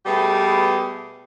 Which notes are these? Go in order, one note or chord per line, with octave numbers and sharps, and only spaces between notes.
B2 G3 A3 B3 G4 G#4